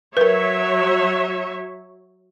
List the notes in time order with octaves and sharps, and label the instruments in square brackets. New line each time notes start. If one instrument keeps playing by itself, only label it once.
[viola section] F#3 C#5 E5 [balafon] A#4 B4